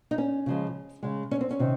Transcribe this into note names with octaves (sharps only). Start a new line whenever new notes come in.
D#4
C#4
C#3 F3 G#3
C#3 G#3
C#4
C4
C#4
C3 D#3